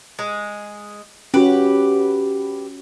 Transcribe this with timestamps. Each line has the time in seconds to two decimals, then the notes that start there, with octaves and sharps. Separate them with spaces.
0.19 G#3
1.34 C#4 F#4 G4 B4